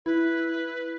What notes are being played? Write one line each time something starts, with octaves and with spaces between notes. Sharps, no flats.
E4 B4